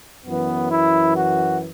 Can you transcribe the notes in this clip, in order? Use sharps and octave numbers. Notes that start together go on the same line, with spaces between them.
F#2 E3 B3
E4
F#4